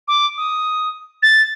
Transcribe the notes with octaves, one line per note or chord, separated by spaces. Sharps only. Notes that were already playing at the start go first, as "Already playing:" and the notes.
D6
D#6
A6